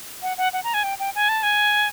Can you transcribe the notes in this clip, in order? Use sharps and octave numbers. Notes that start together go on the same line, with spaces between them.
F#5
F#5
F#5
A#5
G#5
G5
G5
G#5
A5
G#5